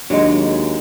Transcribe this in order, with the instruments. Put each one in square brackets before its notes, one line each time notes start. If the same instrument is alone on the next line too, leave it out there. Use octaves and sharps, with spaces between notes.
[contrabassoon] D#2 [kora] F#3 G#3 [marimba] D4 D#5